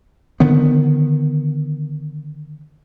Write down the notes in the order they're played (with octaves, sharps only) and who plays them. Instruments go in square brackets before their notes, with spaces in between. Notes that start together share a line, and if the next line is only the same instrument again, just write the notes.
[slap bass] D3 D#3 B3